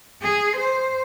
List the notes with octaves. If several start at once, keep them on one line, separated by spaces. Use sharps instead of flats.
G#4
C5